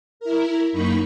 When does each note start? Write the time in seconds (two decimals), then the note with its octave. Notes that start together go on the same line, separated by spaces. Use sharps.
0.20 E4 A#4
0.72 F#2 A#3 D#4 B5 C#6